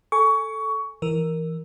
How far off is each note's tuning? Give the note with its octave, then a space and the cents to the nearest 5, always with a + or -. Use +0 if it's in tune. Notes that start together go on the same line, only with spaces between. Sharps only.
A4 +0 G#5 +5 C#6 +20
E3 +0 A#4 +0